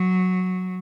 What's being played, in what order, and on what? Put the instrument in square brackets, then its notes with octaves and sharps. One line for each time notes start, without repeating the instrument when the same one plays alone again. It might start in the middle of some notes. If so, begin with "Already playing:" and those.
Already playing: [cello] F#3